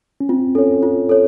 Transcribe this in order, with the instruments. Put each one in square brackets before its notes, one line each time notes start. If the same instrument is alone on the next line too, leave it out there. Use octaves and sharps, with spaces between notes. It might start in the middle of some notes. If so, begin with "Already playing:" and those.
[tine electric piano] C#4
[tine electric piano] C4 [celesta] F4
[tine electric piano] C#4 [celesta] A4 C#5
[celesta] F4
A4 C#5